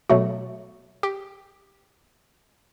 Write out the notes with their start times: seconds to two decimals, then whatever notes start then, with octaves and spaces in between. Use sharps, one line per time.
0.09 B2 F#3 A3 F#4
1.03 G4